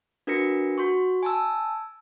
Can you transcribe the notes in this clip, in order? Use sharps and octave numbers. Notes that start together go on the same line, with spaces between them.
D4 F#4 A#4 B4 A#6 C#7
F#4 C6 C#6
G#5 A5 E6